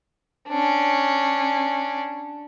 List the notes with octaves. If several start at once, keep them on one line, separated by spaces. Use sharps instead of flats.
C#4 D4